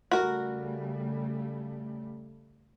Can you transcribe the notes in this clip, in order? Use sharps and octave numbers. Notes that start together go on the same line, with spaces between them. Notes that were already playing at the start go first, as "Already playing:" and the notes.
C#3 G3 A3 F#4 A#4